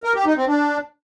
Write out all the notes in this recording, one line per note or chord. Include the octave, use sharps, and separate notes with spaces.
A#4
G4
D#4
C4
D4